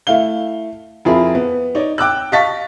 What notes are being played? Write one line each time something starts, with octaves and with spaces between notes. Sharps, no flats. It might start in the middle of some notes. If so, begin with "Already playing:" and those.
A3 E4 F5 G7
F2 E4 F4 G#4 A#4 B5
B3
D#4 C#5 D5
G5 D6 E6 F#6
D#5 F5 A5 C#6 A6 B6